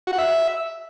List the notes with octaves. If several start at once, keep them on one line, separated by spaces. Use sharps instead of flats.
F#4
F#5
E5